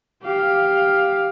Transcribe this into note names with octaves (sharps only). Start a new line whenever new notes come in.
G4 F5